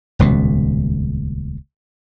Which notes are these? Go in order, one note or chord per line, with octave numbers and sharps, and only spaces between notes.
D#1 C#2 B2